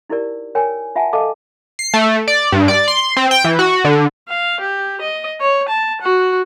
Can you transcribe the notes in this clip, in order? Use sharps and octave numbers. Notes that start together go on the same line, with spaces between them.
D#4 E4 G4 A#4 D5
A#4 C#5 G5 G#5
F4 E5 F#5 G#5 A5
A4 D#5 F5 A5 D6
C7
A3
D5
G2
D5
C6
C4
G5
E3
F#4
D3
F5
G4
D#5
C#5
A5
F#4